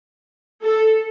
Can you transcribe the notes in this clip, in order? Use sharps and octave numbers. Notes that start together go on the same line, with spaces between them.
A4